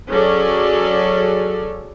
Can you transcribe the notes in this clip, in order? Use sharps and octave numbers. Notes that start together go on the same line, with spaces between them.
F#3 C#4 G#4 A4 D5